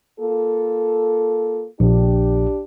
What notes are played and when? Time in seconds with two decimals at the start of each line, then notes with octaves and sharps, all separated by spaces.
0.20 A#3 F4 A4
1.80 A#1 D4 G4